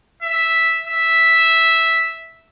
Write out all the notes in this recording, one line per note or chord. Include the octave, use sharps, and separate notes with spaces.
E5
E5